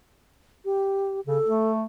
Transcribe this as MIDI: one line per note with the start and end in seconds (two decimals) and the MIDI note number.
0.65 1.20 67
1.27 1.39 49
1.27 1.72 69
1.44 1.85 57